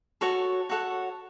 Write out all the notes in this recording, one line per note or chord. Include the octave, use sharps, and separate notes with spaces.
F#4 A4 C#5 F#5
F#4 A4 C#5 F#5